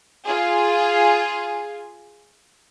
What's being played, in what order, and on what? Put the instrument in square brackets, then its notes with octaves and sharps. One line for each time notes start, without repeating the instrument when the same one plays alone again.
[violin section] F4 G#4